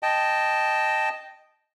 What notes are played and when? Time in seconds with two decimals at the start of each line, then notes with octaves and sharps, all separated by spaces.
0.03 D#5 G5 A5